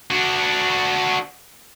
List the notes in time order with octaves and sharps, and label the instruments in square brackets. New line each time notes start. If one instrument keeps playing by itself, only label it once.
[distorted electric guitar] D4 F#4